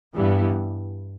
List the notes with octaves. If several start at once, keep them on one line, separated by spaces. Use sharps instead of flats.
G2 E3 G3 B3 E4